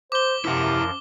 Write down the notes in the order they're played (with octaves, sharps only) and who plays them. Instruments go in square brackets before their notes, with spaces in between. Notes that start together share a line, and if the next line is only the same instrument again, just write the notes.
[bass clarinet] C5 [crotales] D6 G7
[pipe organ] F#2 F3 A#4 [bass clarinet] C3 [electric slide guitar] E4 F#5